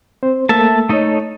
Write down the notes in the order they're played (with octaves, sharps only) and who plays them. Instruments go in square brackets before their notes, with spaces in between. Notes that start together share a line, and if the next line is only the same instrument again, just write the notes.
[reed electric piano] C4 C5
[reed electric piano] A3 A#3 A4 [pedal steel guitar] E5 A5
[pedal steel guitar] A3 D#4 A4 [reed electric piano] C#5 D#5